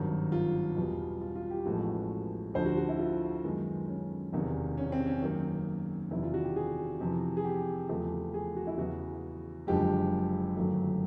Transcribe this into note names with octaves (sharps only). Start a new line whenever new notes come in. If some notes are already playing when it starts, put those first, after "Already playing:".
Already playing: G#1 G2 D#3 F#3
F4
E2 B2 G3
F4
F4
G4
A1 A2 F3 G#3 B3 F#4
D2 D3 F3 C5
F#4
F#4
E4
F4
F#2 D#3 G#3 B3
C#4
E1 E2 C3 D#3
C#4
C4
C#4
F#2 D#3 F#3 A#3
E1 E2 C3 D#3 E4
F4
F#4
G4
G#4
F2 C3 E3
G#4
G4
E2 C#3 F3 A3
G#4
F#4
E4
E2 C#3 E3 F#4
F#1 F#2 D3 F3 G#3 G4
G1 F#2 D#3 F#3 A3